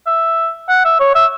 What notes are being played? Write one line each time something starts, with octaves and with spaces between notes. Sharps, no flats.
E5
F#5
E5
C#5
E5